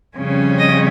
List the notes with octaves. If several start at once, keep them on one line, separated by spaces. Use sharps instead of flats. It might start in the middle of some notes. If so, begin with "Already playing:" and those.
F2 C#3 G3 C#4
D#5